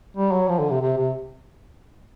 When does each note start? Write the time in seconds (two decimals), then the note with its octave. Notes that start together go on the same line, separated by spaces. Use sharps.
0.17 G3
0.33 F#3
0.49 F3
0.59 D3
0.70 C3
0.81 C3
0.97 C3